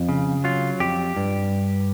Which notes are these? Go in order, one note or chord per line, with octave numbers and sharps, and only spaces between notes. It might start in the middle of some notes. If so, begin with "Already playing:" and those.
Already playing: F2
C#3
F#3 F4
F2 G4
G2